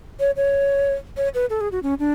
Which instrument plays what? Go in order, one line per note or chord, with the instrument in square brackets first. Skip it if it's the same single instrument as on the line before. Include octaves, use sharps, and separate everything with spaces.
[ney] C#5
C#5
C#5
B4
A4
G#4
F#4
C#4
D4